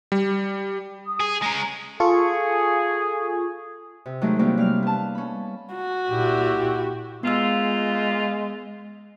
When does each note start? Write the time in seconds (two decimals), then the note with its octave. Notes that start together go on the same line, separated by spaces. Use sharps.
0.12 G3
1.05 D#6
1.20 G#4
1.42 G#3 C#4 A#5
2.00 F4 G#4 A4 C#6
4.06 C3
4.21 D#3 F#3 G#3 A3 D#4 G#4
4.39 C3 F#3 G3 A#3 C4 C#4
4.58 G3 F5 F6
4.82 B3 A5
5.15 C#4 B5
5.76 F#4
6.10 A#2 E4 G4
7.23 A#2 G#3 B3 F4 E6